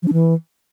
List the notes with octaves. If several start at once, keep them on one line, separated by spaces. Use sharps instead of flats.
F3
D4
E3